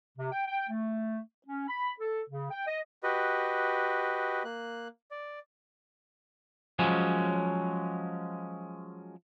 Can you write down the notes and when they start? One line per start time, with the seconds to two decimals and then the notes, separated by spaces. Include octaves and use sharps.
0.18 C3
0.32 G5
0.47 G5
0.70 A3
1.47 C#4
1.68 B5
2.00 A4
2.30 C#3
2.51 G5
2.67 D#5
3.03 F#4 G4 B4 D#5
4.45 A#3 F#6
5.11 D5
6.79 F3 F#3 G#3 C#4